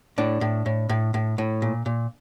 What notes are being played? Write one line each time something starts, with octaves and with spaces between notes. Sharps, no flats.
A2 D4
A2
A2
A2
A2
A2
A#2
A#2